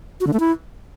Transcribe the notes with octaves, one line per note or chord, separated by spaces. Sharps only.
F#4
D3
A3
E4